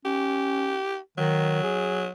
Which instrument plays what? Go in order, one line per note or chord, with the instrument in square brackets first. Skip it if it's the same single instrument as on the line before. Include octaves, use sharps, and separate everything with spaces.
[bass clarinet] C#4 [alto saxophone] G4
[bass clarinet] D#3 [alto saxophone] F#3
[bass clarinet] G#4